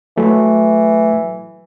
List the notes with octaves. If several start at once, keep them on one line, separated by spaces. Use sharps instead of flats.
E3 F#3 A3